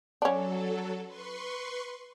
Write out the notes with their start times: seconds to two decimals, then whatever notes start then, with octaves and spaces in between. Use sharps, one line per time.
0.22 F#3 C#4 D4 A4
1.05 B4 C6 C#6